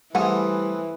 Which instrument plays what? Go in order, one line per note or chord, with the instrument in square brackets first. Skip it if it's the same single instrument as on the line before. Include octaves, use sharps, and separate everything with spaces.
[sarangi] E3 [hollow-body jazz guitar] G3 [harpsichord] A3 C4 G#4 [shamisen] F#5 G#5